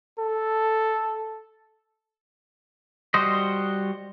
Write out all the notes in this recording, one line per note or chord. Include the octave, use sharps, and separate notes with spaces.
A4
G3 F#4 C5 D#5